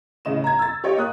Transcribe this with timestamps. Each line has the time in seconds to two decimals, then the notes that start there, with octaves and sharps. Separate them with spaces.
0.25 A2 C#3 D#5 E7
0.44 A#5 G#6
0.59 E6 A6
0.84 G4 C#5 D#5 G5
0.97 A#3 D#6 F#6